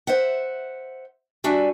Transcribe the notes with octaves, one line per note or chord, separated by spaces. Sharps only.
C5 E5 F#5
G3 D4 F#4 E5 G#5